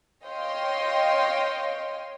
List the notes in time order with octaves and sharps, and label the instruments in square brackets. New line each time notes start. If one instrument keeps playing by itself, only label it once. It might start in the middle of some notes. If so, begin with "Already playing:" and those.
[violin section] C#5 D#5 F5 G5 C6